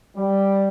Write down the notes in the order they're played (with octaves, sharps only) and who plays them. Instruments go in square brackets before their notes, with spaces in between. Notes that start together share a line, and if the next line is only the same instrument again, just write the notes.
[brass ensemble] G3